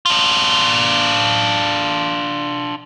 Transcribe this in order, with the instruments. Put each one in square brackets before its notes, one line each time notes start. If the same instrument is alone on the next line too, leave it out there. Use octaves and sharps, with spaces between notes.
[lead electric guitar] D4 F4